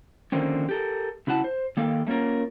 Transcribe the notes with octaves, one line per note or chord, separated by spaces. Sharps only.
D3 D#3 F3 A#3 C4 C#4
G4 A4 A#4
C#3 E4 F#4 F#5 A5
C5
D#3 A#3 A4 F5 G5
A3 A#3 C#4 F4 A#4